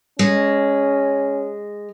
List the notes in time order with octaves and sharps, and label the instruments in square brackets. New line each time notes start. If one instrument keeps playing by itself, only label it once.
[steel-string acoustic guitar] G#3 [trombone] C#4